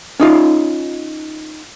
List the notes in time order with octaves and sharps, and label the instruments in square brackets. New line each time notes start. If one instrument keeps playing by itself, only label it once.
[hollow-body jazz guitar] C#4 D#4 F4